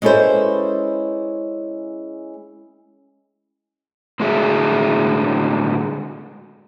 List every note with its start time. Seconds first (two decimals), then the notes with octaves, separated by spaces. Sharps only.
0.02 G#3 C#4 E4 A4 B4 C5
4.20 A2 D3 G#3 F#4 G#4 E5